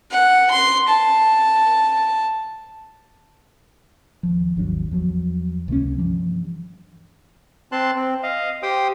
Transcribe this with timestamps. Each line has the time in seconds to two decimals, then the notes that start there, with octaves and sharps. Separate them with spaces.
0.12 F#5
0.51 C6
0.89 A5
4.23 D#2 F3
4.56 G#1 D#2 F#3 D4
4.91 E2 F3 F#3
5.68 C#2 C3 A#3 C#4
5.97 G2 E3 F3 G3
7.72 C4 A5 C6 F#6
7.96 C4
8.23 D#5 F5
8.63 G4 C5 G5 D#6